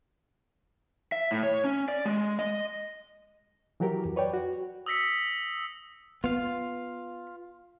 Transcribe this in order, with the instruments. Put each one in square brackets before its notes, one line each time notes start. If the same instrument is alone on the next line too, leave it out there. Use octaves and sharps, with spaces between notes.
[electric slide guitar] E5
A2
C#5
C#4
D5
G#3
D#5
[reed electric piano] E3 F#3 F#4 G4 A#4
F2
B4 C#5 D5 G5
F#4
[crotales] D#6 E6 A#6 B6 C#7
[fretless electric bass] B3 [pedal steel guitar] F4 F5